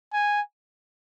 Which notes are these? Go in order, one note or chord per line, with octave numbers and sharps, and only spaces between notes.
G#5